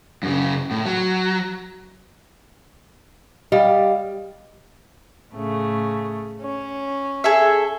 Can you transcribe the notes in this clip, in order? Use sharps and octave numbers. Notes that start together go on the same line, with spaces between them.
F#2 C#3
A2
F#3
G3 D#5 F5
A2 C#3 A3
C#4
G#4 A4 E5